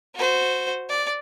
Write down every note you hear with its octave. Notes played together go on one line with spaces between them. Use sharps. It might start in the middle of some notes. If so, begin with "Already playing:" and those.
F#4 C5
D5